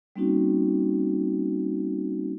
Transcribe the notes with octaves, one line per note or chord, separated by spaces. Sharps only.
G3 A#3 C4 C#4 D#4 F#4